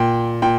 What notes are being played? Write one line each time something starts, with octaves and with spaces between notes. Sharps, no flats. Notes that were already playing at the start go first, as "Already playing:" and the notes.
Already playing: A#2 G5
A#2 G5